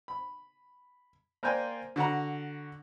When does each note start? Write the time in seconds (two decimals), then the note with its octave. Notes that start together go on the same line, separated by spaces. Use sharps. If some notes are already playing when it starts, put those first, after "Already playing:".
0.08 B5
1.43 A#3 A#4 C5 D5 G5 G#5
1.96 D3 F#4 F#5 A#5